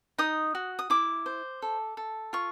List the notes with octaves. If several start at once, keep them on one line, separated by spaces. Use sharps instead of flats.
D#4 D#6
F#4
D#6
E4 D6
C5
A4
A4
F4 C#6